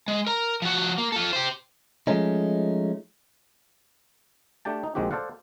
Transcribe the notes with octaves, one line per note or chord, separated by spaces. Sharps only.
G#3
A#4 A#5
F3 F#4
A#3
F4 A4
G4 C5
F3 G#3 A3 C#4 D#4
A3 D4 G4 G5 A5
D#4
A#1 D#3 G#3 C4 F#4 G4
A4 C5 D5 F5 F#5